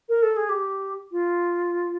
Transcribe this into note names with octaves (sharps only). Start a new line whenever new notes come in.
A#4
A4
G#4
G4
F4